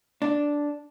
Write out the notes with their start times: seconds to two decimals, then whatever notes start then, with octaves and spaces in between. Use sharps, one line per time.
0.22 D4